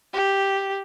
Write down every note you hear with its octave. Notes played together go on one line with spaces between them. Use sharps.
G4